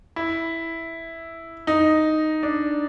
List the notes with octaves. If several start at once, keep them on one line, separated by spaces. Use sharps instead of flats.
E4
D#4
D4